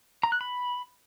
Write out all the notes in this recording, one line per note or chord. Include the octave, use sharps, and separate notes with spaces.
A#5
F#6
B5